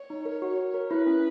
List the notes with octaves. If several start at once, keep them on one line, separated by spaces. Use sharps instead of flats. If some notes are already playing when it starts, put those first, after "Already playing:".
Already playing: C#5
D#4
A#4
F#4
A#4
A#4
E4 B4
C#4